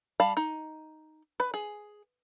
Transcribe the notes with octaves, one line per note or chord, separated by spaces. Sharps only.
G3 F5 A5 B5
D#4
B4
G#4